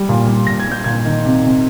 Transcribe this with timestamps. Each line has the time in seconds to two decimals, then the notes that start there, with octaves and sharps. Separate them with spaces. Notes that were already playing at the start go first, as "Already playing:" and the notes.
Already playing: G3
0.09 A#2
0.27 G3
0.47 A#2 A#6
0.60 G#6
0.67 G3 G6
0.84 A#2 G#6
1.05 D#3
1.25 C3
1.45 C3